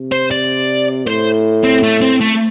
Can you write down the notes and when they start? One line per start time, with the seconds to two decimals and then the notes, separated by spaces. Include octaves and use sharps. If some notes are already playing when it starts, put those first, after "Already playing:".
Already playing: C3
0.12 C5
0.31 D5
1.07 A2 C5
1.64 C4
1.83 A3
2.02 C4
2.21 A3